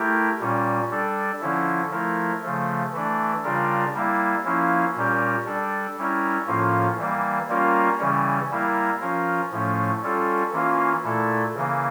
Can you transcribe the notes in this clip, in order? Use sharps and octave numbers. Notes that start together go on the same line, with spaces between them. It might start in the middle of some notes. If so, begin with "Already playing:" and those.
Already playing: A3 E4 G4 A#4
A#2 G3 C#4
G3 D4 A4
D3 F3 C#4 E4
F3 A3 E4 A#4
C#3 F3 A3
E3 A3 D4
C#3 G3 D4 F4 A#4
G3 A#3 E4
F3 A#3 C#4 E4
A#2 G3 C#4 G4 A#4
G3 D4 A4
G3 C#4 E4 A#4
A2 F3 A#3 C#4 F4
E3 G3 A#3
G3 A#3 C#4 F4 A#4
C#3 E3 G3 C#4
G3 A#3 E4 A#4
F3 C#4 F4 A#4
A2 F3 A3 C#4
G3 C#4 F4 A4
E3 A#3 C#4 F4
A#2 A3 E4 A4
C#3 E3 A#3